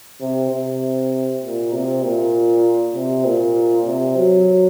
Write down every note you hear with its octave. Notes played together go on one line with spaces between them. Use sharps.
C3
C3
A#2
C3
A#2
C3
A#2
C3
F#3